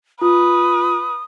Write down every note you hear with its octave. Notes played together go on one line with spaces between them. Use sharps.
F4 B4 D#6